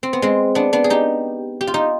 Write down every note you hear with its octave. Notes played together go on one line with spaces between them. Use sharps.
C4
B3
G#3 C4
B3 D4
B3 D4
G#4
D#4 G4
G4
F4
D#4 G4